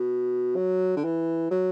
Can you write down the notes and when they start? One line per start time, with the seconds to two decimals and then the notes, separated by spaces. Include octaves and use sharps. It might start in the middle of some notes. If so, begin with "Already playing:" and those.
Already playing: B2
0.56 F#3
0.97 D3
1.04 E3
1.51 F#3